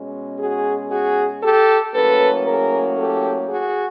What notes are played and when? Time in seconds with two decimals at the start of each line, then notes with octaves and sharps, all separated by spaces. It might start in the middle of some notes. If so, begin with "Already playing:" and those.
Already playing: B2 G#3 C#4
0.39 F#4 G#4
0.91 F#4 G#4
1.42 G4 A4
1.94 A2 F#3 A#3 C#4 A4 B4
2.46 G#4 A#4
2.98 G4 A4
3.49 F#4 G#4